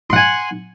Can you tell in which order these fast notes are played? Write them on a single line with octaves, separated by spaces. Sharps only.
C6 F#5 G#5